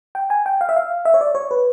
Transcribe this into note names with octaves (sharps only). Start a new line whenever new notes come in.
G5
G#5
G5
F5
E5
F5
E5
C#5
D5
C#5
B4